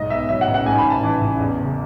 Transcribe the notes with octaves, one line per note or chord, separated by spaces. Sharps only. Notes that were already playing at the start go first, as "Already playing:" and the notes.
Already playing: B1 G#2 D#5
B3 E5
F#3 E5
F#5
A1
F#5
G#2 G#5
B5
A1
A5
E3
A1
E2
F#1